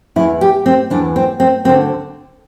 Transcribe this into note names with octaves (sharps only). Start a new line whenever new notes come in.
E2 E3 E4
G4
C4
E2 E3 D4
C4
C4
D2 D3 C4